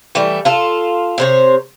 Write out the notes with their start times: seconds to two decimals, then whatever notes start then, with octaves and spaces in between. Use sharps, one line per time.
0.15 E3 G3 A3
0.45 F4 A4
1.18 C3 C5 C#5